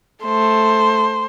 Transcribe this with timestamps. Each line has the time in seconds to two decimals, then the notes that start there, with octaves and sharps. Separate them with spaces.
0.24 A3 C5